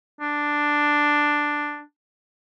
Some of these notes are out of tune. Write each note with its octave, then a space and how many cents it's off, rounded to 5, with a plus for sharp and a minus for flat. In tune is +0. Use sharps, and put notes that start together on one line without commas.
D4 +5